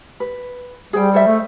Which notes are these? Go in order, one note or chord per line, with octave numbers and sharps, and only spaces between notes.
B4
G3 G#4 C5 G5
A4 C5 E5
A3